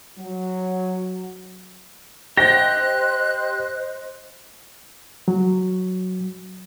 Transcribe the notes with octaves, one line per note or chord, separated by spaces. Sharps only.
F#3
G4 C5 D#5 G5 F#6 A#6
F#3